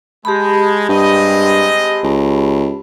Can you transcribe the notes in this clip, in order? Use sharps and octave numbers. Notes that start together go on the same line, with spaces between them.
G#3 G4 A5 B5
G2 G#3 C4 D#5
C#2